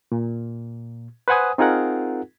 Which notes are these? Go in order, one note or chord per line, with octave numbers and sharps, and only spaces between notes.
A#2
B4 C5 F#5 G#5 D#6
C4 D#4 F4 G#4 A#4 F#5